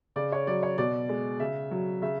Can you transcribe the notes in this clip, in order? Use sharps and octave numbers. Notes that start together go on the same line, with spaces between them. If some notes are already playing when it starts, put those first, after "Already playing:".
C#3 D5
C#5
F#3 D5
C#5
B2 D5
G#3
C#3 E5
F#3
C#3 E5